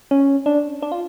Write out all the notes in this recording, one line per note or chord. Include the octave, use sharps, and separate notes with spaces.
C#4
D4
D4
F4